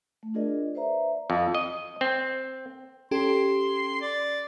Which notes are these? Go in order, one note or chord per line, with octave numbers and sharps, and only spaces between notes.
A3
D4 F4 G#4 A#4 D5 D#5
B4 C5 D5 E5 A#5
F2
D#5
C4
C#4 G4 A4 C6
D5